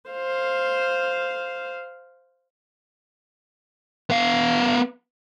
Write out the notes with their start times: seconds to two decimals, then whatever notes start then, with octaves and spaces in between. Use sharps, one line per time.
0.10 C5 F5
4.10 B3 F5